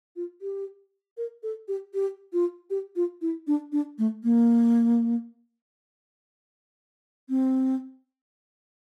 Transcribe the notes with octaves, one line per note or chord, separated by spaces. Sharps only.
F4
G4
A#4
A4
G4
G4
F4
G4
F4
E4
D4
D4
A3
A#3
C4